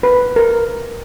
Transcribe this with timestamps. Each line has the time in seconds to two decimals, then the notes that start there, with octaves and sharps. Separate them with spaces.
0.03 B4
0.36 A#4